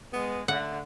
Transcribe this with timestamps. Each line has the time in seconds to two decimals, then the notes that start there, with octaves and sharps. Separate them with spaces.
0.13 G#3 B3
0.48 D3 A3 F#5